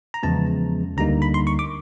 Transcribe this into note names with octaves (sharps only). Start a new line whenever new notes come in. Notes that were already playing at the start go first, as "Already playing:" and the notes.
A#5
E2 C#3 F3 G#3 B3 A5
D2 D3 G3 A#3 D#4 A#5
B5
C6
C#6
D6